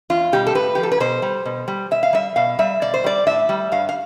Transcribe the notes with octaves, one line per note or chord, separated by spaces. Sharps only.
E2 F4
B2 G3 G4
A4
A2 B4
F3 G4
A4
B4
B2 C5
G3
B2
G3
B2 E5
F5
G3 E5
B2 F5
G3 E5
B2 D5
C5
G3 D5
A2 E5
G3
G2 F5
F5